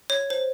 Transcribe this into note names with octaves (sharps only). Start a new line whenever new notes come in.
C#5
C5